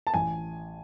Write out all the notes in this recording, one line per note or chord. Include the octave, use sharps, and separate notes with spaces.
A5
A1 G#5